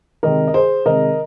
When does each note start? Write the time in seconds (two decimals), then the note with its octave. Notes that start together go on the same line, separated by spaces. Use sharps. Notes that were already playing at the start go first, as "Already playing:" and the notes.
0.23 C3 D#3 G#3 A#4 D#5
0.47 D#5
0.54 G#4 C5
0.86 C3 D#3 G#3 A#4 D#5